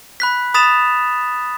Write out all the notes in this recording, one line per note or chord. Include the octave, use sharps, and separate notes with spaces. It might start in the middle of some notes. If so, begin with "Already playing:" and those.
B5 F#6 B6
B5 D#6 A6 B6 E7 F7